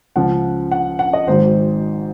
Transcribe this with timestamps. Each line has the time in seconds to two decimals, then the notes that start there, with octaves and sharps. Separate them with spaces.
0.16 C#2 C#3 F3 F#5
0.71 F#5
0.99 F#5
1.13 D#5
1.27 G#1 G#2 F#3 C5